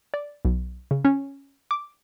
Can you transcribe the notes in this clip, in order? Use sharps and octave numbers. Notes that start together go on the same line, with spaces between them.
D5
B1
C#3
C#4
D6